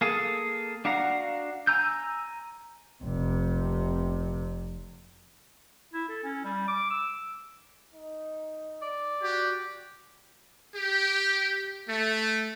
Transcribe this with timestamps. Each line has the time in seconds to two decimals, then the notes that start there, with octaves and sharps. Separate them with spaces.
0.01 A#3 G#4 A4
0.85 D4 F#4 F5 F#5 A#5
1.67 G#5 A#5 E6 G6
3.04 F1 C3
5.94 E4
6.09 A4
6.24 C#4
6.45 G3
6.68 D6
6.90 E6
7.94 D#4
8.82 D5
9.23 F#4 G4
10.75 G4
11.89 A3